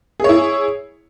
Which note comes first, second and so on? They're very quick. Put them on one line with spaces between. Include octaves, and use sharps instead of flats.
G#4 C#5 E4